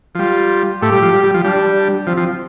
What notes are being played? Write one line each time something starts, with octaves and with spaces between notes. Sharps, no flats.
F3
G3 F4
A2 A3 G4
G3
F3
G3
G3
F3
G3 D4
F3 C4
F3